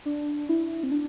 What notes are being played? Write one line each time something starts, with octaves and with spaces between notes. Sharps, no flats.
D4
E4
C4
D4